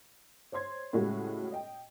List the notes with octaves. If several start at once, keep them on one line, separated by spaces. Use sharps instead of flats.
C5 C#5 C6 G#6
A2 C#3 G3 G#3 C#4 F#4
D#5 G5